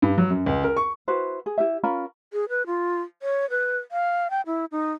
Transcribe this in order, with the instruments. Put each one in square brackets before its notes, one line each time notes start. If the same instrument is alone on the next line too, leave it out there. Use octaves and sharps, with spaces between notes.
[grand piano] G2
F#3
F#2
C#2
A#4
C#6
[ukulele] E4 F#4 B4 C5
G#4
E4 G4 E5
C#4 F4 A#4 B5
[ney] G#4
B4
F4
C#5
B4
F5
G5
E4
D#4